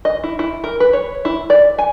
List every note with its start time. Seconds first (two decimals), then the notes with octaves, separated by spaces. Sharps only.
0.05 D#5
0.24 E4
0.39 E4
0.64 A#4
0.80 B4
0.93 C#5
1.25 E4
1.50 D5
1.79 G#5